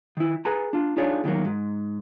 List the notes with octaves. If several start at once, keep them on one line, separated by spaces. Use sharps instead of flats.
D#3 E4
G#4 B4 G#5 A#5
D4 F4
D4 D#4 F4 G#4 C#5 D5
E2 D#3 F#3 A#3
G#2